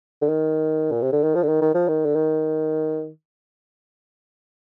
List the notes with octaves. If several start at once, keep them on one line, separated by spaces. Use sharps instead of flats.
D3
D#3
A#2
C3
D3
D#3
F3
D3
D#3
D#3
F3
D#3
D3
D#3